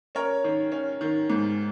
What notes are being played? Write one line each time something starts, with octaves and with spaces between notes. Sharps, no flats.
C#4 A#4 C#5
D#3
C#4
D#3
G#2